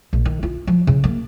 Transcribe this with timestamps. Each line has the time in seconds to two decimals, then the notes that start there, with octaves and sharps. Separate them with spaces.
0.13 A#1
0.25 D#3
0.43 F4
0.67 F3
0.87 C#3
1.04 A#3